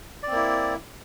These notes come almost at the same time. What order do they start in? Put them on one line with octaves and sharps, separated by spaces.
D5 C4 A#3 E4